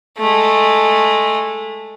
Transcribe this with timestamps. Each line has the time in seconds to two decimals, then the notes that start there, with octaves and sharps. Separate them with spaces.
0.18 G#3 A3